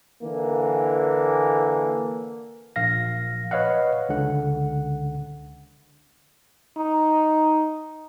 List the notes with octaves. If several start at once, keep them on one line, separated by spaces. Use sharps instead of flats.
D3 E3 A#3
A#1 F5 A#6
B4 C#5 D#5 F5 F#5
C#2 D3 F#5
D#4